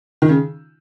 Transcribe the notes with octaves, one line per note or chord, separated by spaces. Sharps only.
D#3
C#3